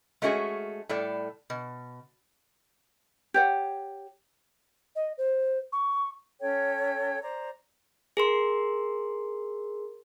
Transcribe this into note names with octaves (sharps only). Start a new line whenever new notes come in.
G#3 A3 C#4 F#4 G#4
A2 G3 A4 D5
B2
G4 C#5 F#5
D#5
C5
C#6
C#4 A4 C#5 G5
C5 D5 A#5
G#4 A#4 C6